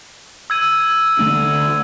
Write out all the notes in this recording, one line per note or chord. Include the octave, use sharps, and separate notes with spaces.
E6 G#6 D#7
D3 A3 D4